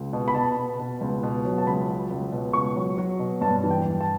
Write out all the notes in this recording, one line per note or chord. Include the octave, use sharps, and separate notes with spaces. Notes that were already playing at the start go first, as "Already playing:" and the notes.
Already playing: C#2
B2
B5
B2 A5
B2
B2
C#2
B2
F#3
A5
C#2 B5
F#3
C#2
B2
C#2 C#6
F#3
F#3
B2
G2 A5
E3
G5
G2
A5